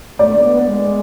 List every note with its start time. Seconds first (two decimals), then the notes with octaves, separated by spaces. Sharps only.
0.19 A3 D5
0.42 B3
0.66 G#3